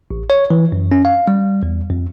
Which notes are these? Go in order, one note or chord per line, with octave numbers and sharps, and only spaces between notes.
A1
C#5
E3
F#2
C#4
F5
G3
E2
F2